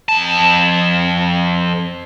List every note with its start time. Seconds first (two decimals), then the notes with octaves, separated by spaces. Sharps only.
0.09 F2 A5